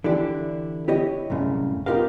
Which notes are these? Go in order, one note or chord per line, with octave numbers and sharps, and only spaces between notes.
D3 E3 D4 E4 G4
E4 G4 C#5 D#5
C2 F#2 A2 C#3
B3 D#4 F4 G4 A#4 F5